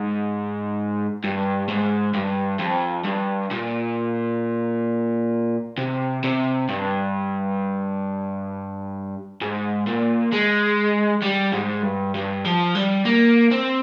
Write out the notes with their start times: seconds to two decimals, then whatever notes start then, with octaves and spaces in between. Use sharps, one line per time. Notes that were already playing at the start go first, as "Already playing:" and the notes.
Already playing: G#2
1.24 G2
1.68 G#2
2.14 G2
2.59 F2
3.05 G2
3.50 A#2
5.78 C3
6.24 C3
6.69 G2
9.42 G#2
9.87 A#2
10.32 G#3
11.23 G3
11.53 G#2
11.83 G2
12.15 G2
12.45 F3
12.75 G3
13.05 A#3
13.51 C4